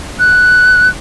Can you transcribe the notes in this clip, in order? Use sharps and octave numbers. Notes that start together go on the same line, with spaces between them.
F#6